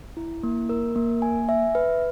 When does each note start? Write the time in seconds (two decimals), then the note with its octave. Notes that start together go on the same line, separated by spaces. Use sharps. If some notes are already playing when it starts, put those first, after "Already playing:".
0.17 E4
0.43 A#3
0.69 A#4
0.96 A#3
1.22 G#5
1.49 E5
1.75 B4